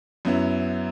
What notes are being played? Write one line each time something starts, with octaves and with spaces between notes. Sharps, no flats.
F#2 F#3 B3 E4